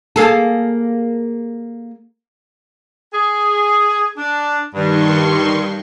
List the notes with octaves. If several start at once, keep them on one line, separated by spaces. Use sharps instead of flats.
A#3 G#4 A4
G#4
D4
G2 D#3 C6 C#6